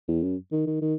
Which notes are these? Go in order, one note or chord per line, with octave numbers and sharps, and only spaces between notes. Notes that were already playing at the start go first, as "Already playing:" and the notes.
E2
F#2
D#3
D#3
D#3